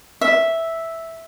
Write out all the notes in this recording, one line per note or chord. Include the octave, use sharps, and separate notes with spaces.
E5